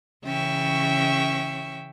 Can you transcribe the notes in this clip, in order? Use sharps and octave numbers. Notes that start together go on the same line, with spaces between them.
C#3 E3 C#4 E5 G5 C#6